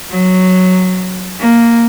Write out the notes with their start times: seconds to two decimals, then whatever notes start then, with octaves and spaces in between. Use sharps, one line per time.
0.11 F#3
1.40 A#3